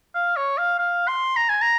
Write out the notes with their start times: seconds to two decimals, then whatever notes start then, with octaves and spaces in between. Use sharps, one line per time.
0.15 F5
0.37 C#5
0.58 F5
0.79 F5
1.08 C6
1.37 A#5
1.49 G#5
1.62 A#5